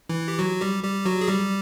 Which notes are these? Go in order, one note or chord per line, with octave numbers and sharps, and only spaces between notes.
E3 E4
G4
F#3 F#4
G3 G4
G3 G4
F#3 F#4
G#4
G3 G4